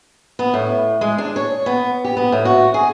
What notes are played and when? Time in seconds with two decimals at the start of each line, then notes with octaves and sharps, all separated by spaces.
0.39 B3
0.54 A2
1.01 G#3
1.18 D4
1.36 C#5
1.66 B3
2.04 G4
2.17 B3
2.32 A2
2.45 F#4
2.74 G#4